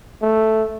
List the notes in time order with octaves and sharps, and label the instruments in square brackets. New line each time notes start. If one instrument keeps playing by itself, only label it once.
[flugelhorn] A3